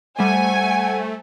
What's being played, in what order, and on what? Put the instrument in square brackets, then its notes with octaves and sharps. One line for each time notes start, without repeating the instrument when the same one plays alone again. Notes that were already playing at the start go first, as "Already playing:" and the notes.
[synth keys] G3 C5 [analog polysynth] A3 [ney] F#5 [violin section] G#5